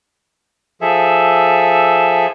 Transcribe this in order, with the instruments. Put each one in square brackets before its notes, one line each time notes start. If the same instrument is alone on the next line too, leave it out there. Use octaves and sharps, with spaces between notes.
[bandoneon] F3 G#4 A4 E5